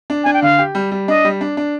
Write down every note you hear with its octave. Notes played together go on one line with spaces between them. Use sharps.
D4
D4 G#5
G5
D3 F5
G4
G3
G3
D4 D#5
G3
D4
D4